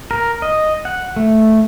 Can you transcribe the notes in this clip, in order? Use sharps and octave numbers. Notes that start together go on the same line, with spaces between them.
A#4
D#5
F#5
A3